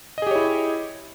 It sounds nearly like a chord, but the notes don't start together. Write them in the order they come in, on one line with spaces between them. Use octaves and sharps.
D#5 G#4 G4 C#5 E4